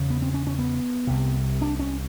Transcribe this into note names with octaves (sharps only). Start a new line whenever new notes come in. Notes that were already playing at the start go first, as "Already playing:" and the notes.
Already playing: E2 C#3
B3
C4
C#4
C#4
B3
C2 C3
D4
C#4